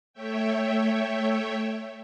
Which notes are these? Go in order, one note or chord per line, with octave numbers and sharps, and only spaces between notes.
A3 C#5 E5 G5